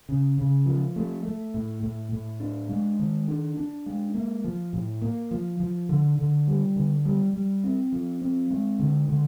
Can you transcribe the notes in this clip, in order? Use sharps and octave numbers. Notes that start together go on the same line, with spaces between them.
C#3
C#3
F3
A3
A3
A2
A2
A2
D4
G#3
D#3
D4
D4
G#3
A#3
F3
A2
A#3
F3
F3
D3
D3
G3
D3
G3
G3
C4
F3
C4
G#3
D3
D3